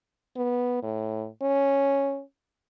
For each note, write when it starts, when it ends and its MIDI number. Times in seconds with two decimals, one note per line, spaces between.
0.37 0.80 59
0.83 1.28 45
1.42 2.22 61